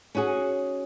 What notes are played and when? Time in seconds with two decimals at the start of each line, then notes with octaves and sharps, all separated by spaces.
0.15 C#4 D#4 F#4 G#4